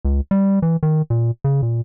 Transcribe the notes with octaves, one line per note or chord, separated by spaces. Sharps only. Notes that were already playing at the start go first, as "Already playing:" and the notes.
C#2
G3
E3
D#3
A#2
C#3
A#2